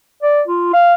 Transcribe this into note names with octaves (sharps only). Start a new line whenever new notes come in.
D5
F4
F5